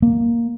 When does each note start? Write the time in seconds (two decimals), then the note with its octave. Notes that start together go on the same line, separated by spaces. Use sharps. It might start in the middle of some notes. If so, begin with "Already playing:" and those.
0.02 A#3